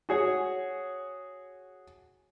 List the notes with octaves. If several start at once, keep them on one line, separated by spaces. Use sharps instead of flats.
F#4 G#4 C#5